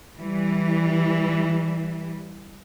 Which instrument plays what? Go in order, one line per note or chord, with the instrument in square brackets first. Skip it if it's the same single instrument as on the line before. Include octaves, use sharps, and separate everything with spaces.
[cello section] E3 G3